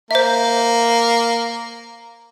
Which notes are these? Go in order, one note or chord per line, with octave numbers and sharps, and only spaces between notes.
A#3 C5 E5